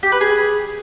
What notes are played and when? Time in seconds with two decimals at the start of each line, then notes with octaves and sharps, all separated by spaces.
0.03 G4
0.12 B4
0.21 G#4